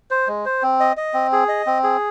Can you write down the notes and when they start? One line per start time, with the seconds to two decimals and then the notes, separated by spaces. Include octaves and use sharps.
0.11 C5
0.27 G#3
0.46 C5
0.62 C4
0.80 D#5
0.97 D#5
1.14 C4
1.32 G#4
1.48 D#5
1.66 C4
1.83 G#4